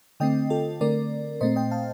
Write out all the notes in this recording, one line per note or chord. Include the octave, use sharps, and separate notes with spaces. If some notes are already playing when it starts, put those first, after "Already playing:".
D3 A3 C4 D#5 G5
F4 A4
D3 A3 C4 A#4 D5
A#2 A3 C4 C5 D#5
D#5 G5
F5 A5